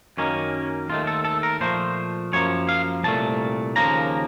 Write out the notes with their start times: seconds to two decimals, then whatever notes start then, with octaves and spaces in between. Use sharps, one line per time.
0.17 F#2 D#3 A#3 C#4
0.89 D#2 D#3 A3 F4
1.07 A4
1.25 A4
1.43 A#4
1.60 A#2 F3 A3 C5
2.33 F#2 F3 A#3 C#5
2.69 F5
3.04 C2 A#2 A3 A5
3.76 D#2 C#3 F3 A#3 A#5